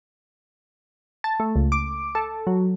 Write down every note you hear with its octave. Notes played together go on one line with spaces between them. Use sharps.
A5
A3
C#2
D6
A4
F#3